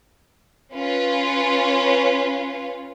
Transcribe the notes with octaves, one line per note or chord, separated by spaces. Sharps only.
C#4 F4 B4